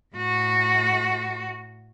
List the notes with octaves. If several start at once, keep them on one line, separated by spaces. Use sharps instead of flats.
A2 F#4